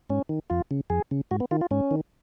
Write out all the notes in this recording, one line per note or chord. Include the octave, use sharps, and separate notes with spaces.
G#2 C#4
D#3
F2 F4
C#3
F2 G#4
C#3
G#2 F#4
B3
D#3 F4
F4
G#2 C#4
D#3